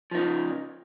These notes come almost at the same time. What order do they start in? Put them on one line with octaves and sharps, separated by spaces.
F3 D#4 C#3